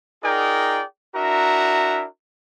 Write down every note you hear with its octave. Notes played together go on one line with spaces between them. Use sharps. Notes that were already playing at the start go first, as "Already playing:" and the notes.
D#4 F4 G#4 A#4 D5 G5
D4 E4 F#4 A#4 E5 A#5